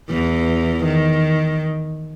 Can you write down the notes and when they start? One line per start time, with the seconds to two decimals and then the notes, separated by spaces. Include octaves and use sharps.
0.10 E2 E3
0.84 D#3